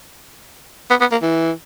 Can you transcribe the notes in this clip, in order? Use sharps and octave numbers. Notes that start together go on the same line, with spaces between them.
B3
B3
A#3
E3